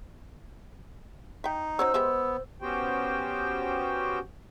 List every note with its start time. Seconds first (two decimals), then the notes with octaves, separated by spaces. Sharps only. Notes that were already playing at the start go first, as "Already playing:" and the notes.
1.44 D#4 E5 G5
1.79 F#3 C#4 C5 C#5 E6
1.94 G#3 B3 G4 E5
2.61 B3 C#4 F#4 G4 C5 G5